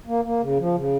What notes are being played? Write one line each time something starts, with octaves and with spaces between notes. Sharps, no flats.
A#3
A#3
C#3
F3
C#3